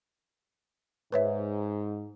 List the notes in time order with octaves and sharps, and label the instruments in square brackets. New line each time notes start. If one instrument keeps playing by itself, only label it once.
[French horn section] G#2 [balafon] B4 C#5 E5